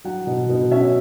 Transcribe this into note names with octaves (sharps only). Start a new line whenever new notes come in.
F#3 F#5
B2
B2
C#4 E5